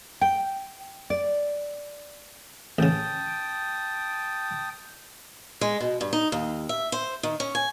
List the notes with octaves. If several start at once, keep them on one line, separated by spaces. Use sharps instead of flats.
G5
D5
A1 C#3 G5 A5 D#6
G#3
B2
G2
D#4
D#2
E5
C5
D#3
C#4
G#5